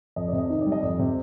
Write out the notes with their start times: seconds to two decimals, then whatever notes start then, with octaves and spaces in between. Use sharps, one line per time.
0.16 F2 D#5
0.28 C3 D5
0.38 D#5
0.50 D#3
0.61 D5
0.66 G3
0.72 D#5
0.82 F2 D5
0.99 C3